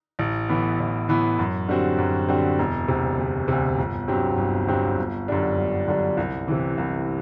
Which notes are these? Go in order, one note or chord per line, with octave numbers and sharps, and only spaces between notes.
A1
A2 E3 B3
A1
A2 E3 B3
F#2
D3 G3 C4 F#4
F#2
D3 G3 C4 F#4
E1
D2 C3
E1
D2 C3
G1
G2 F#3 C4 G4
G1
G2 F#3 C4 G4
G1
F#2 D3 G3 D4
G1
F#2 D3 G3 D4
C2
C3 E3
C2